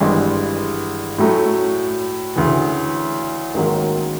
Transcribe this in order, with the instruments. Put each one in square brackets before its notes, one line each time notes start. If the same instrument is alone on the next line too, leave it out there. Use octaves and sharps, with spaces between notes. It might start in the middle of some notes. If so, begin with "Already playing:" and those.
[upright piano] G#1 G2 E3 G#3
A2 F#3 A3 C#4
D2 C#3 E3
A1 G#2 D#3 F#3 A#3